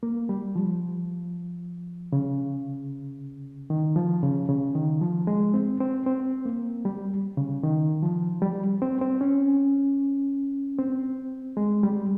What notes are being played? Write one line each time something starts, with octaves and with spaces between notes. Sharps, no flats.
A#3
G3
F3
C#3
D#3
F3
C#3
C#3
D#3
F3
G#3
C4
C4
C4
A#3
G3
C#3
D#3
F3
G3
C4
C4
C#4
C4
G#3
G3